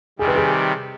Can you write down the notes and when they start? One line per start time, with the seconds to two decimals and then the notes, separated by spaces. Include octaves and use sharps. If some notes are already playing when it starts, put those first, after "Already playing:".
0.19 C3 D#3 G3 G#4
0.28 B4
0.36 G#4